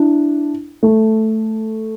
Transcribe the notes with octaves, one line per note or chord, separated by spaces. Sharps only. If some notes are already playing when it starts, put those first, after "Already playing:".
Already playing: D4 E4
A3